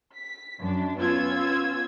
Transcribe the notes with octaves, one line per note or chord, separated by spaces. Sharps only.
B6
F#2 D4
B3 C#4 F4 E6 G#6